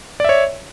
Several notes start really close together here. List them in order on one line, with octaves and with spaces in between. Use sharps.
D5 E5 C#5